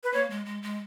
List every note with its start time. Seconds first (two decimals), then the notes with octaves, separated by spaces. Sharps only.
0.04 B4
0.14 A#3 C#5
0.30 G#3
0.46 G#3
0.63 G#3